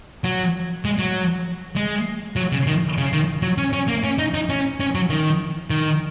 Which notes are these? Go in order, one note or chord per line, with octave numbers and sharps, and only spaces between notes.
F#3
G#3
F#3
G#3
F#3
C#3
D#3
C#3
D#3
F#3
C#4
C#4
A#3
C#4
D#4
D#4
C#4
C#4
F#3
D#3
D#3